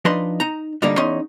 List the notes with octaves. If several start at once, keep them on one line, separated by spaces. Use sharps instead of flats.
F3 D4 D#4 B4 D#5 C6
D#4 A#5
G2 A#2 D3 G3 A#3 D#4
E2 C#4 D#4 C6